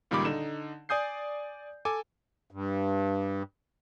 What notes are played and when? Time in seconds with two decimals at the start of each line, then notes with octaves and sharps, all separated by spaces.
0.11 C#2 A#2 D#3 G3 B5 D6
0.25 D3 D#4 E7
0.89 D5 G#5 D#6 G6 C7
1.85 A4 G#5 D6
2.51 G2